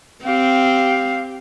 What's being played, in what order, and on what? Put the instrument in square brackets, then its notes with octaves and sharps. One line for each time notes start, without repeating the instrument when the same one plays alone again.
[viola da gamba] C4 [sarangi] G4 [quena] F5